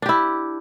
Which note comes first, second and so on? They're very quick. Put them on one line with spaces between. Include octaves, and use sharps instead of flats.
D4 G4 E4